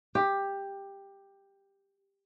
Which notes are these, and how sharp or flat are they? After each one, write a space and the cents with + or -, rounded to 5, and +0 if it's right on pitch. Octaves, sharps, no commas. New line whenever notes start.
G4 +10